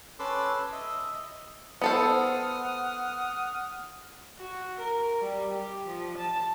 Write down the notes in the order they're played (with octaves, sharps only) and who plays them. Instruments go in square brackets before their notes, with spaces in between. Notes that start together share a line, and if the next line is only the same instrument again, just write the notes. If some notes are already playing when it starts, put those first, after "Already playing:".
[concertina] C#4 A4 B4 C6 D6 E6
D#5 E5
[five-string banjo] B3 A4 C5 [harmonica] F#5 D#6 F6
[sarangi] F#4
A#4
G3
G4
F3
A5